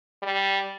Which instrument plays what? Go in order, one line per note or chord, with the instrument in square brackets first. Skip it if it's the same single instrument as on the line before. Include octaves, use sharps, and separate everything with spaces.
[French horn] G3